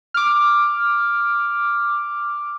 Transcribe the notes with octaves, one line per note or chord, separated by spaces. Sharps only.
D6 F6